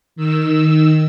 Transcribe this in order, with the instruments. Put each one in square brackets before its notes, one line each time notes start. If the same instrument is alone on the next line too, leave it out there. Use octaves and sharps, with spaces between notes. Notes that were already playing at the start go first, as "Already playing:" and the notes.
[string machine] D#3 E6